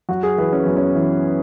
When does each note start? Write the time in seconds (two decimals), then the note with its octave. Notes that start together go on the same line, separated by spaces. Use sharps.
0.09 F#2 F#4
0.23 G#4
0.38 E3 B4
0.53 C#4
0.63 F#2 B3
0.77 C#4
0.95 E3